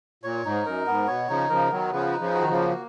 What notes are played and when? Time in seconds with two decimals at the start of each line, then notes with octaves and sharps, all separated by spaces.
0.23 A#2 C#5
0.44 G#2 D#4
0.65 F#2 A#4
0.87 G#2 B3
1.07 B2 C#5
1.29 C#3 F3 D#4
1.49 C#3 F3 A#4
1.71 D#3 F#3 B3
1.92 C#3 F3 B4
2.13 D#4
2.20 C#3 F3
2.35 F#4
2.41 D#3
2.49 C#3 F3
2.55 A#3